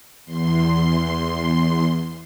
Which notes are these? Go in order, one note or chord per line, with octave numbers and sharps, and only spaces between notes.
E2 C6